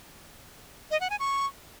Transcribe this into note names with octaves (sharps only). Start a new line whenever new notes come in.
D#5
F#5
G#5
C#6